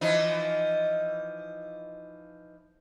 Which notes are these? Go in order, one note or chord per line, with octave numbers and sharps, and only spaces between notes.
E3 F3 D#4